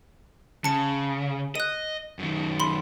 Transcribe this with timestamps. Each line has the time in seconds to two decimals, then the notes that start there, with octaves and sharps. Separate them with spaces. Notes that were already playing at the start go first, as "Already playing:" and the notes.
0.64 C#3 A5 C#7
1.55 D#5 F#6 D#7
2.19 F#2 D#3
2.60 B5 C6